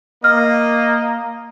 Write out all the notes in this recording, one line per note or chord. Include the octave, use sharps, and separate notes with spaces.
A#3 D#5 F6